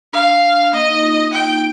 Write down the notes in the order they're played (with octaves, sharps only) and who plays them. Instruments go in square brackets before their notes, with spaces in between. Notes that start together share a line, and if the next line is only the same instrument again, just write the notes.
[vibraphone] D4 [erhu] F5
[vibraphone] A#3 [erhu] D#5
[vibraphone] D#4
F4
[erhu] G5